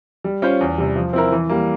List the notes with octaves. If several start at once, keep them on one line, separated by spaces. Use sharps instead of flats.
G3
C#4 F4 C5
E2
C3 G3
F3
C4 E4 A#4
E3
G3 A#3